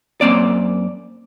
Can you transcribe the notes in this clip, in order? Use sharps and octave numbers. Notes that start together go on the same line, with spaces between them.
F#2 A#3 C4 D5